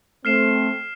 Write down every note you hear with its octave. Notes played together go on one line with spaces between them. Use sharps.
A3 C4 F6 C7 E7